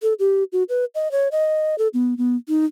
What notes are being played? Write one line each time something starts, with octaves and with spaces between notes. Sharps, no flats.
A4
G4
F#4
B4
D#5
C#5
D#5
A4
B3
B3
D#4